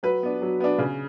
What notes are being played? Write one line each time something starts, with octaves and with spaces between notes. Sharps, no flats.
F#3 B4
B3 D4
F#3
B3 D4
C#3